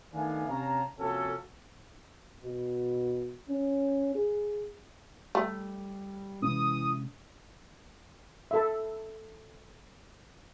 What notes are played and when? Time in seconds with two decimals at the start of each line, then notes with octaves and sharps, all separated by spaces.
0.14 D#3 A3 B3 D4 F5 G#5
0.49 C3 C#4 C#5 F5 A5 A#5
0.98 C3 F3 A#3 C#4 F#4 A4
2.43 B2
3.49 C#4
4.15 G#4
5.35 G3 A3
6.42 C3 E3 G#3 C#4 D#6
8.51 A4 E5